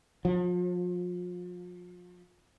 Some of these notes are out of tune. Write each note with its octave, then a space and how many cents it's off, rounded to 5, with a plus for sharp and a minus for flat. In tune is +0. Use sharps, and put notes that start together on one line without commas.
F3 +35